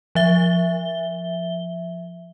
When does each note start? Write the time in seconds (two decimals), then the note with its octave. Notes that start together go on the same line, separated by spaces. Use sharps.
0.15 F3 E5 G7